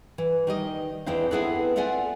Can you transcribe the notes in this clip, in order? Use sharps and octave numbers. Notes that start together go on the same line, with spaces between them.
E3
D#3 G3 D#5
E2 C4 E4 C5 F5
B3 C4 E4 G#4 A4 B4
F4 A4 D5 E5 F#5 G#5